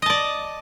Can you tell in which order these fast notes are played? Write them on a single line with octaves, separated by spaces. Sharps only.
D#5 A5 D5